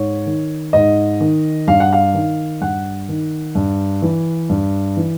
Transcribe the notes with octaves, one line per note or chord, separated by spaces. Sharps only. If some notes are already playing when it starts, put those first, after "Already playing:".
Already playing: G#2 C#5
D#3
G#2 D#5
D#3
G2 F5
F#5
F5
D#3
G2 F#5
D#3
G2
E3
G2
E3